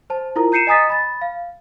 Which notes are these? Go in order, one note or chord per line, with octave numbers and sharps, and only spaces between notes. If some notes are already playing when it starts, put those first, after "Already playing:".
C5 A5
E4 F4 A#4 A#5
A#5 G6 C7 C#7 D#7 E7
D#5 G#5 A#5 D#6 A6 B6
B5 A6
F5